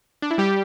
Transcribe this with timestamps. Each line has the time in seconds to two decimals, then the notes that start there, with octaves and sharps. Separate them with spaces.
0.22 D4
0.31 E4
0.38 G3 G4